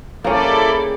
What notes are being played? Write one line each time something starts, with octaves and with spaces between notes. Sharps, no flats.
C#3 G3 A#3 C#4 E4 A4 D5